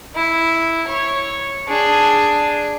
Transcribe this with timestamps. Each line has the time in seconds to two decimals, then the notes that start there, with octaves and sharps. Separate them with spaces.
0.15 E4
0.88 C#5
1.68 D4 G#4